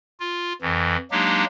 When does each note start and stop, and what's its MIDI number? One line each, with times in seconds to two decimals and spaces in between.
0.20 0.53 65
0.62 0.97 41
0.62 0.97 52
1.11 1.45 54
1.11 1.45 56
1.11 1.45 58
1.11 1.45 62
1.11 1.45 63
1.11 1.45 67